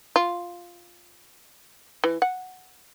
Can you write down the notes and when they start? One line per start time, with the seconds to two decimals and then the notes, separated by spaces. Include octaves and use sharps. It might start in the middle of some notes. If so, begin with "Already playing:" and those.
0.16 F4
2.04 E3
2.22 F#5